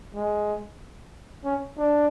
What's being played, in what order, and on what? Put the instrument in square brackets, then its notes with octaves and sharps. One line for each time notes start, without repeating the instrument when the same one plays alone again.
[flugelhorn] G#3
C#4
D4